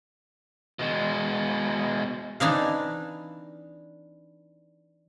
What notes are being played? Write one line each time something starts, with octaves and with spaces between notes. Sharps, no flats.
B2 G#3
E3 D4 D#4 F5